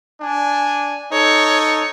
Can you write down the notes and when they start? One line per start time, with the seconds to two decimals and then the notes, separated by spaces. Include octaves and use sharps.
0.21 D4 G#5
1.12 D#4 A4 C#5